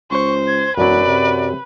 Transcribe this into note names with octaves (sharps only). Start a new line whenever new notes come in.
C#2 C5 C#6
G#6
E1 F#2 F#3 B4 D5
C3